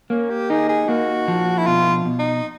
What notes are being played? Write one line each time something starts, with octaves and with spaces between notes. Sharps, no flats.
A#3 C#4
G4
D#4 G#4
G#4
A#3 F#4
F3
E4
B2 F4
B2
D#4